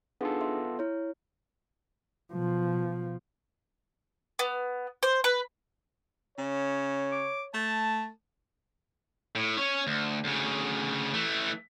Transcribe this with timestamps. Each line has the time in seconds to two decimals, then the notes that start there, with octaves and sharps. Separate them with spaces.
0.21 B3 D4 D#4 F4 G#4 A4
0.41 E5 C6
0.79 E4 C#5
2.33 B2 F3
4.39 B3
5.03 C5
5.24 B4
6.38 C#3 C#5
7.12 D6
7.54 A3 A5
9.35 A2
9.57 C#4 C#5
9.87 D2
10.24 D2 C#3
11.14 E3 A3